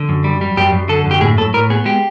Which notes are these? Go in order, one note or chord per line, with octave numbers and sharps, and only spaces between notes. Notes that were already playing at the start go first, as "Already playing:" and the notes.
Already playing: D3
F#2
G3
G3
F#2 G4
F#2
D3 A4
F#2 G4
A2 G#4
A2 A4
A2 A#4
B3 G#4
G#3 G4